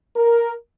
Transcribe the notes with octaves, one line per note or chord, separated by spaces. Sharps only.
A#4